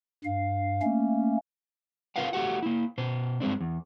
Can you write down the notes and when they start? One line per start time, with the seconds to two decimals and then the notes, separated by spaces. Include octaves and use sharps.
0.24 G2 F5
0.82 A3 A#3 C#4
2.16 F4 A#4 B4 F5 F#5
2.33 A3 F#4 G4 F#5
2.63 A#3 E4
2.98 B2 C5
3.40 G2 G#3 C4 D4
3.61 E2